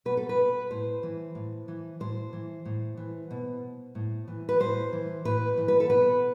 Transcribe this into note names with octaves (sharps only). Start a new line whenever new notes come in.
B2 B4
A4
B4
A2 C5
E3
A2
E3
A2 C5
E3
A2
E3
B2
A2
E3
B4
A2 C5
E3
A2 B4
E3
B4
A4
B2 B4